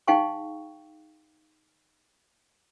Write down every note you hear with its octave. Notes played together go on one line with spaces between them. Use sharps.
D#4 G#4 F5 G5 G#5 C#6